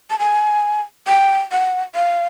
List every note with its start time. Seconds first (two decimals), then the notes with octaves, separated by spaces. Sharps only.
0.10 A5
0.19 G#5
1.07 G5
1.52 F#5
1.95 F5